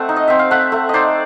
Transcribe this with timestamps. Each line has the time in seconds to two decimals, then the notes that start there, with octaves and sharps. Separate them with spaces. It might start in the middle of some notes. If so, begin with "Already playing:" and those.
Already playing: A3 C4 E5 F#5
0.09 D#4
0.16 D#5
0.28 C4 E5
0.39 F5
0.51 A3 E5 F#5
0.72 A3
0.89 D#4 C5 D5 D#5